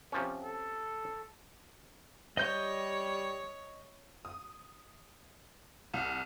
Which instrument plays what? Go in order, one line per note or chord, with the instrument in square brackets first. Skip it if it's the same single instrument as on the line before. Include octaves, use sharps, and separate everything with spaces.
[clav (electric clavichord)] C3 F3 C#4
[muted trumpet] A4
[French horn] G3 [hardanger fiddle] C#5 [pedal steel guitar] D#5 G6
[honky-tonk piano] D#6
C2